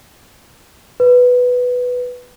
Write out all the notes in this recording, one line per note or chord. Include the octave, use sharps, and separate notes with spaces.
B4